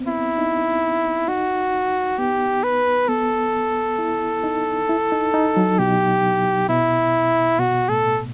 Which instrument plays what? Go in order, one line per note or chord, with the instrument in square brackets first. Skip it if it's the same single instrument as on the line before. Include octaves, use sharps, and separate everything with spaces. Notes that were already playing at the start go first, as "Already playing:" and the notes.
Already playing: [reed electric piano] B3 C4
[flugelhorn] E4
[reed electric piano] D#4
[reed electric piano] D#4 [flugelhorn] F#4
[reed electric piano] B3 [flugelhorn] G4
[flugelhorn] B4
[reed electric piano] B3 [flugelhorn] A4
[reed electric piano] E4
D#4
E4
D#4
D#4
F#3
[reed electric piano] B2 [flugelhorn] G4
[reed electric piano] B2 [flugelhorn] E4
[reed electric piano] B2 [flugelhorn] F#4
[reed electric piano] A2 [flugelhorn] A4